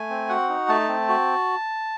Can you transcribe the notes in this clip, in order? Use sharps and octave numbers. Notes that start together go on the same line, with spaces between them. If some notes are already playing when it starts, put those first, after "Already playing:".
Already playing: A3 G#5
C4
F#4 F#5
D#4
A3 A5
C4
F#4